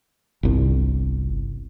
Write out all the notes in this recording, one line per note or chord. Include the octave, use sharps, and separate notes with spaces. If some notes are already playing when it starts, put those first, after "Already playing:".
G1 C2